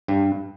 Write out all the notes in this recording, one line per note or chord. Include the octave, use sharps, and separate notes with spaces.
G2